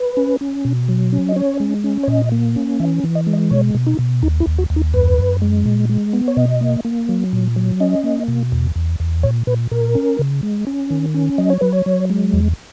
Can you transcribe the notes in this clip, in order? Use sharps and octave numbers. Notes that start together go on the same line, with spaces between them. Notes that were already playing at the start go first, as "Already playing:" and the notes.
Already playing: B4
C#4
C#4
B2
F#3
C#4
D#5
C#4 C#5
G#3
C#4
C#5
A#2 D#5
A#3
C#4
E3 E5
E3
D#5
G#3
D#5
B2 C#5
B2
D#4
B2
D#2 D#4
E4
D#2
F#4
D#2
D#4
F#2 B4
F#2
G#3
A#2
G#3
B3
C#5
B2 D#5
A#3
A#3
F#3
A#2
F#3
C#4 D#5
A#3
B2
E2
E2
E2
A#2 C#5
A#2 B4
A#2 A#4
C#4
C#3
G#3
C#4
D#3
C#4
F#3 D#5
C#5
F#3 B4
C#5
F#3
G#3
E2